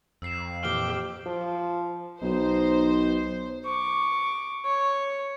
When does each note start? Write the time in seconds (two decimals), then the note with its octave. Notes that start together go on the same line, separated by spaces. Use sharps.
0.22 F2 E6 C7 E7
0.63 A#2 E3 G4 G5 F6 G7
1.26 F3
2.22 B1 D#4 C5
3.66 C#6 D6
4.65 C#5